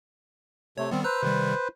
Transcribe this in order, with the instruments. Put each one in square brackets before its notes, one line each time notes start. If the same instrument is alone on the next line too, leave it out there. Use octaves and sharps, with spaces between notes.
[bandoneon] C3 A3 [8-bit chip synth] C#5
[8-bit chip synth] D#3 G3 B3 [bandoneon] C4
[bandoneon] B4 C5 [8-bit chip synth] A#5 E6 F#6
[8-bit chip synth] C3 D#3 G3